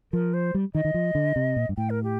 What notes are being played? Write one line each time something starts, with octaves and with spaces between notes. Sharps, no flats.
F3 A#4
C5
G3
D#3 D#5
D#3
F3
D3
C3
A#2
G2
A2 G5
A#4
G4